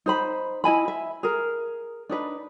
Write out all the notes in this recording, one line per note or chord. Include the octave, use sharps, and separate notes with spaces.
D#4 C5 B5
E4 D#5 G#5 B5
E5
G#4 A#4
D4 D#4 B4